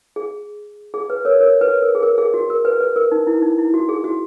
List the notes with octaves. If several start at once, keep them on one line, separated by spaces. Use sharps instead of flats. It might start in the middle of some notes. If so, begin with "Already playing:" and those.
G#4
G#4
B4
A#4 C#5
A#4 C#5
B4
A#4
G#4
A#4
G#4
F#4
A#4
B4
B4
A#4
D#4
E4
D#4
E4
F#4
G#4
F#4